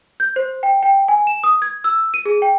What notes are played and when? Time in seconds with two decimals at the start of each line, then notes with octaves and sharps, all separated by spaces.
0.20 G6
0.36 C5
0.63 G5
0.83 G5
1.08 G#5
1.27 E7
1.44 D#6
1.62 G#6
1.84 E6
2.14 D#7
2.25 G#4
2.42 G5